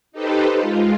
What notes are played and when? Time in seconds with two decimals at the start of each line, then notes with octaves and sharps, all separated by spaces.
0.12 D#4 G4 A4 B4 C5
0.57 G#3 F4